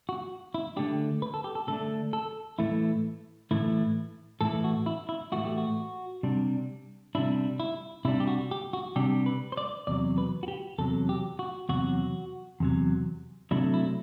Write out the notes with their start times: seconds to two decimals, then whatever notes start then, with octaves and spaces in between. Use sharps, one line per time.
0.09 F#4
0.54 E4
0.76 D3 A3 D4 G4
1.22 B4
1.34 A4
1.44 G4
1.55 A4
1.68 D3 A3 D4 A4
2.13 A4
2.59 A2 E3 A3 E4
3.51 A2 E3 A3 E4
4.41 A2 E3 A3 E4 A4
4.64 F#4
4.86 E4
5.09 E4
5.32 A2 E3 A3 E4 F#4
5.45 G4
5.58 F#4
6.23 C3 G3 D4
7.15 C3 G3 D4 E4
7.60 E4
8.05 C3 G3 D4 E4
8.20 G4
8.27 F#4
8.51 G4
8.73 F#4
8.96 C3 G3 D4 G4
9.26 B4
9.52 C5
9.57 D5
9.87 E2 C3 F#3 D5
10.18 B4
10.43 F#4
10.48 G4
10.78 E2 C3 F#3 A4
11.09 G4
11.39 F#4
11.69 E2 C3 F#3 F#4
12.60 E2 C3 F#3
13.51 C3 F#3 A3 D4 E4
13.74 E4